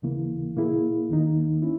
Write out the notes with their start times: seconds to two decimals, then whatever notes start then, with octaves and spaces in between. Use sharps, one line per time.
0.02 D#2 C#3 E3 A#3 E4
0.56 A#2 A#3 E4 G#4
1.09 D#2 D#3 A#3 D#4
1.62 C#4 E4